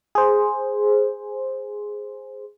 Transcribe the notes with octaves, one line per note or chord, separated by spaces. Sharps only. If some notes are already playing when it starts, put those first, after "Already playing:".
G#4 C5